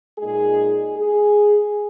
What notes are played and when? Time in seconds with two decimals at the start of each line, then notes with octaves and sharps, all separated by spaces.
0.18 A#2 G#3 D#4 G#4
0.97 G#4